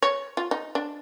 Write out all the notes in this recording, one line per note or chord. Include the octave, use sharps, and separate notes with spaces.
C#5
F4
D#4
D4